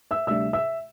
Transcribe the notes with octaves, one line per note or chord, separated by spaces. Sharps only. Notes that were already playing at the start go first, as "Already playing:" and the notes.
E5 E6
D2 C3 G3 D4 E5 E6
E5 E6